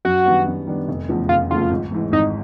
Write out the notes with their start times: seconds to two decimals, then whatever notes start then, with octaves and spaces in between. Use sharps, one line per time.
0.05 F#2 F#4
0.26 D#3 G3 B3 D4
0.47 F#2
0.67 D#3 G3 B3 D4
0.88 F1
1.09 E2 C#3 F3 A3
1.29 F1 F4
1.50 E2 C#3 F3 A3 F4
1.71 G#1
1.92 G#2 E3
2.12 G#1 D#4